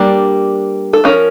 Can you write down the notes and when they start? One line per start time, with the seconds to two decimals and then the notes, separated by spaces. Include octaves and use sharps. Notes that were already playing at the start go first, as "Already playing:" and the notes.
Already playing: G3 A#3 D4 G4
0.93 A4
1.04 F3 C#4 A#4